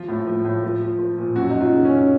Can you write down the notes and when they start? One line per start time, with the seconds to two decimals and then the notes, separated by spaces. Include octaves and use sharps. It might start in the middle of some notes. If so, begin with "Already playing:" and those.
Already playing: F3 F4
0.08 A2
0.27 F3
0.45 A2
0.63 F3
0.82 F3
0.99 F3
1.18 A#2
1.35 F#2 F#4
1.50 F#2 D#4
1.61 F4
1.73 C#3
1.85 C#4
1.91 F#2